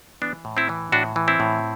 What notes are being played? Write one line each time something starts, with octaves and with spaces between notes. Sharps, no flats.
E3 B3 D4
A2
C4 E4
E3
A2 D4 F#4
E3
C4 E4
A2